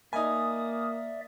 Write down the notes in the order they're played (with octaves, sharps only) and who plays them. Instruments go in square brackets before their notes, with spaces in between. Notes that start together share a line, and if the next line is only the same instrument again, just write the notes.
[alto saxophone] A#3 [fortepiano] D#4 G#5 [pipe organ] D5 E5 [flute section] D#6